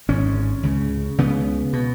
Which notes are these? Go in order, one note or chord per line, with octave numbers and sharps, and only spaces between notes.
G#1 G#2 C#4
C#2 C#3
C#2 C#3 B3
B2